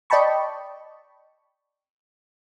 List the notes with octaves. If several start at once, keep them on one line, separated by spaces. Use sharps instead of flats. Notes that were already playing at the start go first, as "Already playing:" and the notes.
D5 D#5 G5 A5 B5 C#6